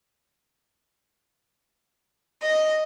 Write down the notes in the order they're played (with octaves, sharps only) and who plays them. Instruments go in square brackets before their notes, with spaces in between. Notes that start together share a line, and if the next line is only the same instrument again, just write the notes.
[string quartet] D#5